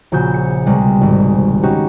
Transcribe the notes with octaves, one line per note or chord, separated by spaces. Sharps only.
A#1 C#3 F#4 G6
C#7
C2 B2 G3 G#3
G#1
C#4 D#4 F#4 G4